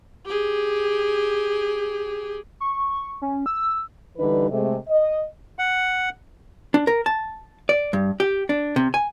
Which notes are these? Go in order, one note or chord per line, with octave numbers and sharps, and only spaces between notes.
G4 G#4
C#6
C#4
E6
D3 E3 G3 D#4 B4
C3 G#3 A3
D#5
F#5
D4
A#4
A5
D5
G2
G4
D4
C3
G#5